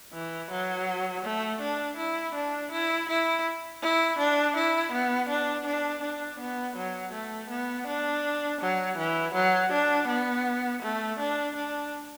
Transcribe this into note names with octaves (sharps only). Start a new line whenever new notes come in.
E3
F#3
A3
D4
E4
D4
E4
E4
E4
D4
E4
B3
D4
D4
D4
B3
F#3
A3
B3
D4
F#3
E3
F#3
D4
B3
A3
D4
D4